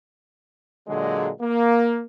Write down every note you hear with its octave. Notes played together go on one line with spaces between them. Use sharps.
A#2 D3 F#3 G#3
A#3